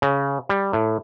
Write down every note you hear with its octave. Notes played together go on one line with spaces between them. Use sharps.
C#3
G3
A2